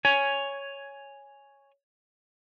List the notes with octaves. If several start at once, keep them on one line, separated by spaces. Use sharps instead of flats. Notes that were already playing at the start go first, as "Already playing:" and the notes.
C#5 G#5